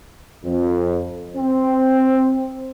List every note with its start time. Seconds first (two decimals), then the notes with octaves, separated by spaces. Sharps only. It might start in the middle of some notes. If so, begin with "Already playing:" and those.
0.43 F2
1.37 C4